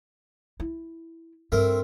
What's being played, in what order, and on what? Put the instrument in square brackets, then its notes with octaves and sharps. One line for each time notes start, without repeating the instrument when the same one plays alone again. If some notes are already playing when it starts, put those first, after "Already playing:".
[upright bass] E4
[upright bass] G2 [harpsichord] A3 C4 A#4